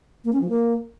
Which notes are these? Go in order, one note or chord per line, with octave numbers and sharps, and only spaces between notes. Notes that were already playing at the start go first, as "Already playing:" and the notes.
A#3
C#4
F3
A#3